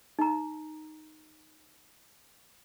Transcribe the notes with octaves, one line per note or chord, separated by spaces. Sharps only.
D#4 A#5